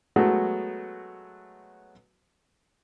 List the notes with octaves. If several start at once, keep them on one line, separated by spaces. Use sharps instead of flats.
F#3 G#3 A3 B3 F#4